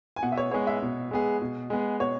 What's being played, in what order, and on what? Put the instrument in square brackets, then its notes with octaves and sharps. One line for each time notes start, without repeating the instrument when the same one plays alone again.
[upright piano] G#5
[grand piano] B2 [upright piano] F#5
[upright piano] E5
C#5
[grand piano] G#3 B3 G#4 [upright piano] C#5
[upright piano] E5
[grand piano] B2
G#3 B3 G#4
B2
G#3 B3 G#4
[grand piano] B2 [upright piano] C#5